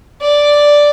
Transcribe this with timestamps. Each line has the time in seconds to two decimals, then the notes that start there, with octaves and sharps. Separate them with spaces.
0.22 D5